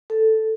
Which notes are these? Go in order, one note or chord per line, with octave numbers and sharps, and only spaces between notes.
A4